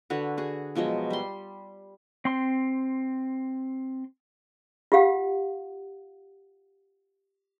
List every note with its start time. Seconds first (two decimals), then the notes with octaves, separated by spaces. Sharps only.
0.10 D3 F#4 B4
0.37 F#4 G#4
0.75 B2 F3 F#3 G#3
1.10 G3 C6
2.25 C4 C6
4.92 F4 G4 F5 F#5